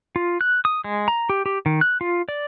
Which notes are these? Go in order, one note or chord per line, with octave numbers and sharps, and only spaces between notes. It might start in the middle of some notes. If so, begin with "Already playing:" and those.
F4
F#6
D#6
G#3
A#5
G4
G4
D#3
F#6
F4
D5